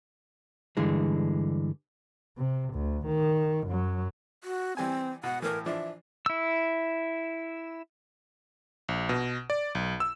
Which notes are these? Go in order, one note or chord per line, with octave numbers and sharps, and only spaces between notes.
G2 D3 E3 G#3
C3
D2
D#3
F#2 F#3
F#4
E3 G3 C4 G#5
B2 F#5
A2 E3 A#4
E3 F3 D4 E5
E4 E6
A#1
B2
D5
B1
E6